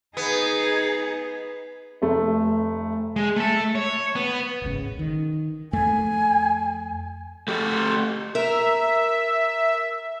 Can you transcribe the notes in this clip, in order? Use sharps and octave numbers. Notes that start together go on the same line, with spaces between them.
B3 D#4 G#4
F1 A3
G#3
A3 E5
C#5
B3
D1 G#1 C#3
D#3
F2 A3 G#5
A3 G4
A#4 E5